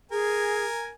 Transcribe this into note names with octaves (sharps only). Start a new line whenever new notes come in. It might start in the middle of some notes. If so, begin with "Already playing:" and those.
G#4 A#4 G#5